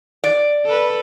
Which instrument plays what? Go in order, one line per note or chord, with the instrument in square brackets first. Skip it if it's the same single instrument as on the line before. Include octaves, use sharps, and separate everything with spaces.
[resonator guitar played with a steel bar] D5
[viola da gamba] A4 B4